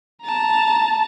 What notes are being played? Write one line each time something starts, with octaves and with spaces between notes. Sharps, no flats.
A5 A#5